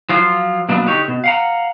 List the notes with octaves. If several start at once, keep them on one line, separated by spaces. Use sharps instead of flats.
F3 F#3 F4
B2 F#3 A#3 B3 D4
D3 D#4 G4 C#5
B2
F5 F#5 A#5